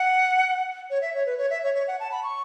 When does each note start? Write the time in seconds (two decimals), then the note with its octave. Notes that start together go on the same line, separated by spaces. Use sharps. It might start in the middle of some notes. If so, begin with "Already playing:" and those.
Already playing: F#5
0.90 C#5
1.01 E5
1.14 C#5
1.26 B4
1.38 C#5
1.50 E5
1.63 C#5
1.74 C#5
1.88 F#5
2.00 A5
2.12 B5
2.23 C#6